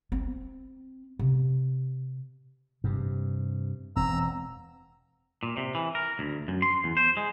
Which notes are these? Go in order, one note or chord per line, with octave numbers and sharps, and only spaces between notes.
C4
C3
G2 C3
E1 C4 A#5 E6
A#2
C3
E3
A#4
D2
F#2
C6
E2
C5
G#3